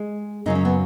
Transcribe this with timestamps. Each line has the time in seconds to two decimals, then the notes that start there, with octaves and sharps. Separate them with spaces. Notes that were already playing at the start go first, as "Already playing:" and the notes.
Already playing: G#3
0.46 F#2 C#3 F#3 D#4
0.55 C#4
0.65 B3